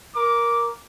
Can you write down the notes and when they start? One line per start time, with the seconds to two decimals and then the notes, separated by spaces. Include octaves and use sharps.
0.15 A#4 D6